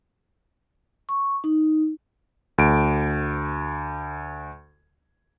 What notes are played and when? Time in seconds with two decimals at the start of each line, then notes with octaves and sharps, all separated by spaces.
1.09 C#6
1.44 D#4
2.58 D2 D7